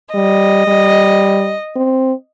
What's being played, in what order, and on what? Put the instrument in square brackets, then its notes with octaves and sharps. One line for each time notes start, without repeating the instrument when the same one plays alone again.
[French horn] G3 [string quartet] D#5
[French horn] G3
C4